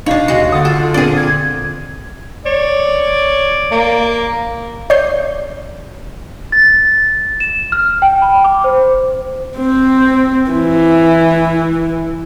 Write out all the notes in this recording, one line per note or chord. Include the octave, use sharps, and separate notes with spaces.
B2 D4 D#4 C#5 F5
D#2 C#3 G#3 F#4
D3 F#5 D#6 A6
F4 A4
A#2 C4 D4 G#4 D5
G#6
C#5 D5
A#3
C#5 D5 D#6 G6 C7
A6
E7
F6
G5
B5
D6
C5
C4
E3